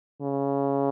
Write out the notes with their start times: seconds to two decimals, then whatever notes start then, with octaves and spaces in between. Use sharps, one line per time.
0.22 C#3